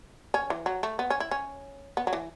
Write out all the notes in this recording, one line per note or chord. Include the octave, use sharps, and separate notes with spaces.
C#4
E3
F#3
A3
B3
C#4
E4
C#4
B3
F#3
E3